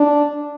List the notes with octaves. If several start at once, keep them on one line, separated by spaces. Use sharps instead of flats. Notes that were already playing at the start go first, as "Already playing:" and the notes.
Already playing: D4